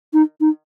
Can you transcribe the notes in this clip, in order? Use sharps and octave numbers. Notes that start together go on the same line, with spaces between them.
D#4
D#4